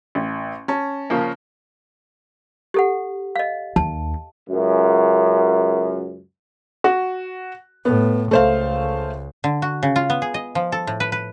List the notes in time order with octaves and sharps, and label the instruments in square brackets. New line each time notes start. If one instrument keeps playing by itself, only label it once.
[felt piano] A1
C#4 A5
[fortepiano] C#3 F3 A#3
[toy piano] G4 A4 F#5
D#5 F5
[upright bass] D#2 [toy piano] A5
[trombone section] C#2 F#2
[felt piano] F#4
[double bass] A2 [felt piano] B3
[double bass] C#2 [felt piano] A3 C5 F5
[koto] D3
F#4
C#3
F4
B3
G#4
D#5
F3
A4
A2
B4
B4